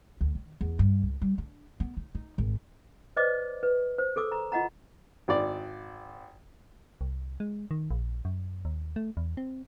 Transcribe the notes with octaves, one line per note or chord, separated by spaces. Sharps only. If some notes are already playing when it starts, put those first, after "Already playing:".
D2
D#3
E2
G2
C#2
G3
D4
B3
D#4
D#4
G#1
B4 C5 D5 D#5 D6
B4
C5
G#4 A4 D6 E6
A#5
F4 D#5 F#5 A#5
G#1 D5
C2
G#3
D#3
A#1
F#2
D#2
A3
E2
C4